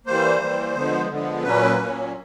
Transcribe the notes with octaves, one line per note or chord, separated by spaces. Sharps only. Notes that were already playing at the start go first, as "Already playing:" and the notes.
E3 G3 A#3 C5
E3 G3 A#3
D3 F3 G#3 B3
D3 F3 G#3 B3
A#2 F#3 A#3 C#4 B4
A#2 F#3 A#3 C#4